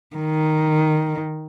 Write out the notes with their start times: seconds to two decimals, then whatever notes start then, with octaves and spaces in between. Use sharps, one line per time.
0.16 D#3